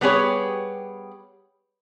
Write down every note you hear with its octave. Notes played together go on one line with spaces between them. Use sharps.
G3 B3 G4 G#4 B4 C#5